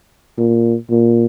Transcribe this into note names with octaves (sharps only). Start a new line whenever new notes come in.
A#2
A#2